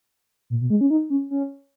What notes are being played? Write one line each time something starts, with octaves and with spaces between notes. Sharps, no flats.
A#2
B2
G#3
C#4
D#4
C#4
C#4